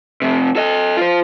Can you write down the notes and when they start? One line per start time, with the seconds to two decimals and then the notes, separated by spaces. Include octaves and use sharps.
0.22 F2 C3
0.56 A4 D#5
0.97 F4 C5